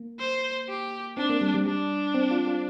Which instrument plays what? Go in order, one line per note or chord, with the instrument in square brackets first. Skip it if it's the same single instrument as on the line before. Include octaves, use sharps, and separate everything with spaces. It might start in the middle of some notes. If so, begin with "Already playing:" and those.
Already playing: [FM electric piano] A#3
[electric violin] C5
G4
[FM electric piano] C4 [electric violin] D4
[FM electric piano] A#3
G3
G3
[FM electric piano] G3 [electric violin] D4
[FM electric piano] C4
F4
F4